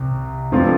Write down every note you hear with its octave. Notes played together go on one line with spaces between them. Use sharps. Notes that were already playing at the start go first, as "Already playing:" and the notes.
Already playing: C2 C3
G2 F3 A3 C4 F4